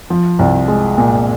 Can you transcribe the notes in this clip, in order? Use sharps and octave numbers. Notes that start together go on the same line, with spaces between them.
F3
C2
G#3
A#2